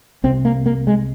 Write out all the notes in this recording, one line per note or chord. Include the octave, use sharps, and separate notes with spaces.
C2 C3 C4
A#3
A#3
G#3